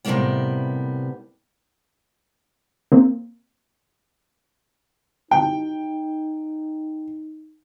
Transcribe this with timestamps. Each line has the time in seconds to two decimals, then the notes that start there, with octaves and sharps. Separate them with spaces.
0.05 A2 C3 E3 G3 A#3 B3
2.92 A#3 C4
5.31 D#4 G5